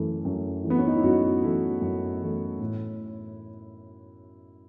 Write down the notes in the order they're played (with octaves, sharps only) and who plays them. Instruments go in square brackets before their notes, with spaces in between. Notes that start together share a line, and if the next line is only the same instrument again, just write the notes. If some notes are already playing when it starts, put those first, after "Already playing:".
Already playing: [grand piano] F#2 E3 A3
F#2
E3 A3
B3
C#4
D#4
E4
F#2 F#4
E3 A3 E4
F#2
E3 A3
A2